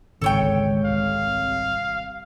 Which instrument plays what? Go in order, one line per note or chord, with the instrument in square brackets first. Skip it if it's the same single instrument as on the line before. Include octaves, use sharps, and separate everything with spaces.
[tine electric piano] G#1 [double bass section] C#2 D3 G#3 [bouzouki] A4 C#5 G5
[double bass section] C2 C3 [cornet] F5